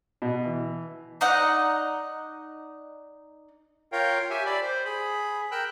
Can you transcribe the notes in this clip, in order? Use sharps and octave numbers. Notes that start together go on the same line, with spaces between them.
B2
E3
D#4 D5 D#5 F#5
F4 A#4 C#5 F5 G5
G4 E5 G#5
D5 B5
C5
G#4 B5
A#4 G5 E6 F#6